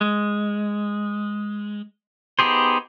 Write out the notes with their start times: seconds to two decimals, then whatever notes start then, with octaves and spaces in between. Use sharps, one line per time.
0.01 G#3
2.39 B3 D#4 G4 G#4 C5